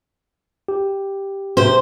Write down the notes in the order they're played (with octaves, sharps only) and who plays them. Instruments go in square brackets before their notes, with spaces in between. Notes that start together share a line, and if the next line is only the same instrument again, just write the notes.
[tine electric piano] G4
[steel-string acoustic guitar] C3 C5